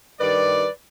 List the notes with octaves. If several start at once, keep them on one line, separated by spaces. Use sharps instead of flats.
G2 D#3 G3 B4 D5